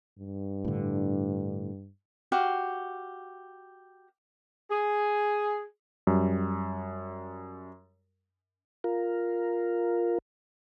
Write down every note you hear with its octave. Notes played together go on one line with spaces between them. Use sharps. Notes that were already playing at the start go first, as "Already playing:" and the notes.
G2
A2 D3
F#4 G4 F5
G#4
F#2 G3
F4 A#4